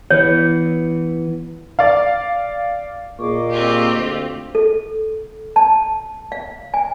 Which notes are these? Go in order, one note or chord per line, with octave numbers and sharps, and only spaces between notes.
E3 B3 C#5
D5 F5
A#2 A#3 G#4 D#5 F5 C#6 D6
C4 F4 G4
D2
A4
A5
F5
G#5